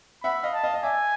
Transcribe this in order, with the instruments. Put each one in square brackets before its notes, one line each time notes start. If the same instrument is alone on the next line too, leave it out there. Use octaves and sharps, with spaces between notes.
[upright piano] E5 F#5 [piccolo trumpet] B5
[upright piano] D#5 F5
[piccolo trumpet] A5
[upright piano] D#5 F5
D#5
[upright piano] D5 E5 [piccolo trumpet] G#5